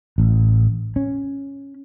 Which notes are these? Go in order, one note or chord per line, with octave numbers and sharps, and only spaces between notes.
A1
C#4